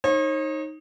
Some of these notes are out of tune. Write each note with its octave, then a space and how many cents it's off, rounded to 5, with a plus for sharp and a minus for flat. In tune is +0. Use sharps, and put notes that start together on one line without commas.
D#4 +0 C#5 -45